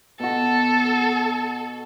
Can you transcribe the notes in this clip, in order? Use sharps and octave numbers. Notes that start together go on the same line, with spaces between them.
B2 F#4 A4